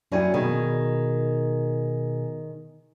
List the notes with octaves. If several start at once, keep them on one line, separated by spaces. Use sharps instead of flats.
F#2 F#3 G3 E4 G#5
B2 D#3 G#4 G#5